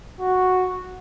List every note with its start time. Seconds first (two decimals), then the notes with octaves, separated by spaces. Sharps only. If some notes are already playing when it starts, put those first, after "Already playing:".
0.20 F#4